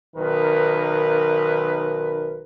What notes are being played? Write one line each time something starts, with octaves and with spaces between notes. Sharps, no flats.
B1 D#3 A#4 B4